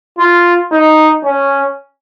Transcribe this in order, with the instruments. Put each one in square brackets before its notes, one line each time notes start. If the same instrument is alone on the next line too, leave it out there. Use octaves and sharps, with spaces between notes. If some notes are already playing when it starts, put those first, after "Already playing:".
[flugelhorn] F4
D#4
C#4